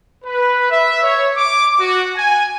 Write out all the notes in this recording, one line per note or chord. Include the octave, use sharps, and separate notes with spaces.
B4
E5
C#5
D6
F#4
G#5